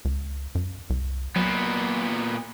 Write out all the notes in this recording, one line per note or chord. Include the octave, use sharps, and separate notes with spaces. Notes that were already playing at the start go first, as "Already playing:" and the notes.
C#2
F#2
C2
A#2 F#3 B3